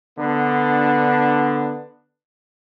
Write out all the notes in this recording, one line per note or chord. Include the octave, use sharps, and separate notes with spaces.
D3 B3 D4